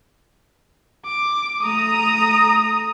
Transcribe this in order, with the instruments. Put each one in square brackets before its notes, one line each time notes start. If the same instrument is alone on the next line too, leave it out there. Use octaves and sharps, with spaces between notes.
[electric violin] D6
[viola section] A3 A#5 [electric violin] D#6